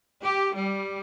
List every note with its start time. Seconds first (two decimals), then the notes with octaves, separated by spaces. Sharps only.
0.22 G4
0.52 G3